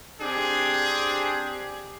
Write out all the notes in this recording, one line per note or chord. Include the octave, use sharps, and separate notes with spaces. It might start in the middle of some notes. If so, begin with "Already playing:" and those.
C4 D4 G4 G#4